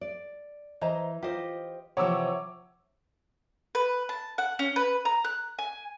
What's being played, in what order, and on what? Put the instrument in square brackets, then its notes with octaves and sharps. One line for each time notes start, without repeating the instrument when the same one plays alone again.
[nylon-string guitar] D5
[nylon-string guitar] E3 [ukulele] C5 D#5 A#5
[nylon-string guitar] F4 D#5 [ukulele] G4 C5
[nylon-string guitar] C3 E3 F3 [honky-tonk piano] C#5 D6 E6 [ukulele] F#5
[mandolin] B4
A5
F#5
C#4
B4
A#5
F#6
G#5